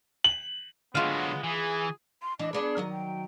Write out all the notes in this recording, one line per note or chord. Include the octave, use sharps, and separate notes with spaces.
F#7
D3 F#3 G#3 B3 F4 F5
E3 G#4
C6
E3 D4 D#5
B3 D4 G#4 B4
D#3 F#3 D#5
G5